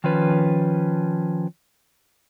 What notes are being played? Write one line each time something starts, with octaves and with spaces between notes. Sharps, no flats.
D#3 F3 C#4 B4